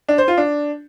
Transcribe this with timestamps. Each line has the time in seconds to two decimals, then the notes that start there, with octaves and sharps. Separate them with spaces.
0.09 D4
0.18 C5
0.28 F4
0.38 D4